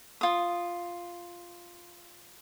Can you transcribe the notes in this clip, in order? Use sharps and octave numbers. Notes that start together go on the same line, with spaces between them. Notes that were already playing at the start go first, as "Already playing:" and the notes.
F4 D#6